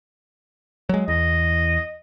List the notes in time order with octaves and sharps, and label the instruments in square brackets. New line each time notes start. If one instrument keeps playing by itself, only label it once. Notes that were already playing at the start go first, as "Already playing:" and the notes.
[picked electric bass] F#3 G#3
[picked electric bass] E2 [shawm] D#5